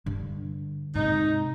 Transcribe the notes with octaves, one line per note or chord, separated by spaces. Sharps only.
G2 D3
G#2 C3 D#4